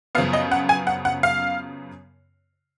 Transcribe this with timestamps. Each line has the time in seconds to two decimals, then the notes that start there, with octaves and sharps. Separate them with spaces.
0.15 F#2 C#3 F3 B3 F5
0.33 D#5
0.52 F#5
0.69 G#5
0.87 F#5
1.05 F#5
1.23 F5